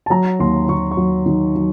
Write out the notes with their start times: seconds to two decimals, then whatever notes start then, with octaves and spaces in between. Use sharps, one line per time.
0.06 A5
0.10 F#3 A#5
0.40 D#2 C6
0.69 D#2 C#6
0.91 C#6
0.97 F#3
1.26 D#3
1.55 F#3